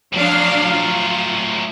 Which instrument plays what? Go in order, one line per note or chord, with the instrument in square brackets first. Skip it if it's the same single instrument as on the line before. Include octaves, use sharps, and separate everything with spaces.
[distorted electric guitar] A2 F#3 [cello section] F3 D4 F5
[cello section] F4